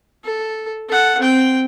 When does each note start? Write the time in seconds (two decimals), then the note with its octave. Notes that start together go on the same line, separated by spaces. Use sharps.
0.25 A4
0.89 A4 F#5
1.20 C4 G5